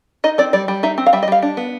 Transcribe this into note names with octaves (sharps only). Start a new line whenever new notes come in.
D#4 D#5
C4 D5
G3 D5
G3
D#4 E5
C4
F5
G3 E5
D#5
G3 F5
D4
B3